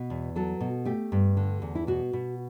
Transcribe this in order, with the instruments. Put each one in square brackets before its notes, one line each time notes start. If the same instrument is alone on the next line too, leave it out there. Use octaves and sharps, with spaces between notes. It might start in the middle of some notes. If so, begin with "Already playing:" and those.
Already playing: [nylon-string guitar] B2
E2
F#3 A4
B2
A3 G4
G2
D3
E2
E4
B2 F#4
B2